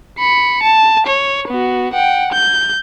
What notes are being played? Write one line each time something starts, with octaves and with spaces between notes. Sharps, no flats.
B5 C#7
A5
C#5
B3 F#4
F#5 G5
G6